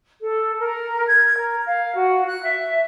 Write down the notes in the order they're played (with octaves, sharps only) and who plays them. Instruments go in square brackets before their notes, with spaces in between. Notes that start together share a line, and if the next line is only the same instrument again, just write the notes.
[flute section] A4
A#4
G#6
A#4
F5
F#4
F#6
E5